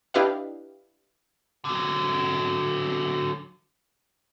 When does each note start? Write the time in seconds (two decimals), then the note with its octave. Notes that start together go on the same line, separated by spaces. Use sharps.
0.14 D4 E4 G4 B4 D#5 F5
1.65 D3 F#3